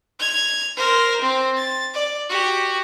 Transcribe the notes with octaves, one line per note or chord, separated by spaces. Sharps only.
G#6 F7
A#4 C5
C4
A6
D5
F#4 G4